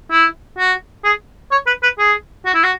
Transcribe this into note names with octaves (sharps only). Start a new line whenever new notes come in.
E4
F#4
G#4
C#5
B4
B4
G#4
F#4
E4
F#4